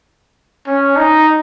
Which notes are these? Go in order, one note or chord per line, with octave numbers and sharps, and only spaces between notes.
C#4
D#4